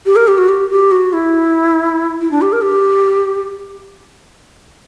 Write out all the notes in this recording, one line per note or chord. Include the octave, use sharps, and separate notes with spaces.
G4
A#4
G4
F#4
G4
G4
F#4
E4
E4
D4
G4
A#4
G4